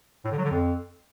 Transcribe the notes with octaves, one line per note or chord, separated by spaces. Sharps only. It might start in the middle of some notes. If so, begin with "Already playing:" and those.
A2
D3
F#3
D3
F2